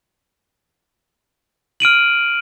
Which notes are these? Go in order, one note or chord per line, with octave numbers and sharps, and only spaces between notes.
F6 D7 D#7 F#7